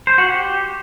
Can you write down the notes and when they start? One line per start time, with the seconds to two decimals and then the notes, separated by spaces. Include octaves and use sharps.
0.07 C5
0.18 F#4
0.29 G4